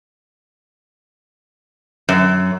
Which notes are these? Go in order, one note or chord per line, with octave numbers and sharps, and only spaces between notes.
F#2